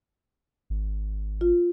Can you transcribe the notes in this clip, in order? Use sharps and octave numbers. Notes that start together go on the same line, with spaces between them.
G#1
F4